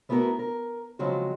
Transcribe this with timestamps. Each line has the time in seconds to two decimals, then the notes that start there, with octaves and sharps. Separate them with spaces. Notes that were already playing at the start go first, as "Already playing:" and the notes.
0.09 A3 B3 E4 F#4 G4 A#4
0.39 A#4
0.99 C#3 F3 F#3 G#3 C4 F#4